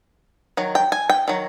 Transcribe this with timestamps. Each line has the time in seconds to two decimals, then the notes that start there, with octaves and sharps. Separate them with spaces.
0.57 D#3 F#3
0.75 G5
0.92 G#5
1.10 G5
1.28 D#3 F#3